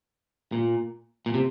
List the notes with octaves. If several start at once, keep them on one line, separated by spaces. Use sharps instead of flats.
A#2
A#2
C3